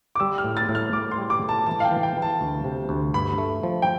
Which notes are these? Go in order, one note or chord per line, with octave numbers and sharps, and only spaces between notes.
D6
G3 E6
F6
A2
A6
A2
F6
A2 D6
C6
G3
D6
A2
A5
E3 A5
F5
G5
E3
G5
E3
A5
D2
C3
D2
G2 B5
A3
F3
G5